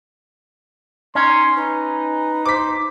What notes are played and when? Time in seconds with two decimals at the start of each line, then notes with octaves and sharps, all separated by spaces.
1.15 C#4 D#4 C6
1.56 D#4 B4
2.46 C5 D6 B6